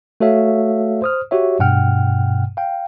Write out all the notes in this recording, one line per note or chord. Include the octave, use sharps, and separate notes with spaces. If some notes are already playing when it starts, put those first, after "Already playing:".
A3 F#4 A4 C#5 E5 F5
C5 D#6 F6
F#4 G4 C#5 E5
G2 B2 F#5 G5 F6
F5 G5